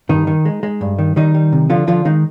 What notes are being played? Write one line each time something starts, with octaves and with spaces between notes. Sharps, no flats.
G2 D#3 D#4
D#3
G#3
G#3
G2
D#3
D#3 G3 D#4
G3
C3
D3 F3 F4
D3 F3 F4
D#3 G#3 D#4